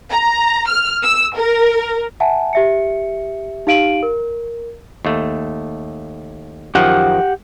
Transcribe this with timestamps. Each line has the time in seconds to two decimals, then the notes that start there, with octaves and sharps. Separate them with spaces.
0.11 A#5
0.67 F6
1.03 E6
1.35 A#4
2.20 E5 F#5 G#5 A5
2.53 G4 E5 C#7
3.67 D#4 G4 F5 D7 D#7 F#7
4.03 A#4
5.05 D#2 A3
6.75 F#2 D#3 F3 G4 F#5